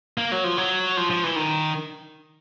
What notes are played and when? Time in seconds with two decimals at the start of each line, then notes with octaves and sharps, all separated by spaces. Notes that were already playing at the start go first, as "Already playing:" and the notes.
0.18 A#3
0.32 F#3
0.44 F3
0.58 F#3
0.97 F3
1.10 F3
1.24 E3
1.36 D#3